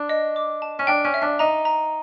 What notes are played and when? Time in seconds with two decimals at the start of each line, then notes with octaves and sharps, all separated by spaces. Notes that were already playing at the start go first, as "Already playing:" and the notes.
Already playing: D4
0.09 D#5
0.36 D6
0.62 A5
0.79 C#4
0.87 D4 G5
1.05 C#4
1.14 E5
1.22 D4
1.39 D#4 A#5
1.65 A#5